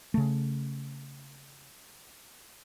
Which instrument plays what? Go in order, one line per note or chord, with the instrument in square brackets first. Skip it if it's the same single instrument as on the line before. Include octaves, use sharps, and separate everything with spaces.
[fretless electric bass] C#3 A3